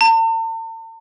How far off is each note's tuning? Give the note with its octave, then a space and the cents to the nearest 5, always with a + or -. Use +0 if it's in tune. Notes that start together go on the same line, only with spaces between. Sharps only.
A5 +45